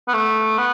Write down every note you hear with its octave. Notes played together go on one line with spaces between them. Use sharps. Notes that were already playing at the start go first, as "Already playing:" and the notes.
B3
A3
B3